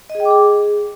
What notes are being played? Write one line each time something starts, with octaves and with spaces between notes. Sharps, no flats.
D#5
G#4
G5
D6
G#4